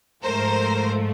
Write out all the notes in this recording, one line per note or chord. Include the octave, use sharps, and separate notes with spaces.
G#2 F3 A3 A#4 C5